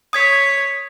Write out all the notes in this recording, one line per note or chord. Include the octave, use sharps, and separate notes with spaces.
C#5 D#6 G#6 B6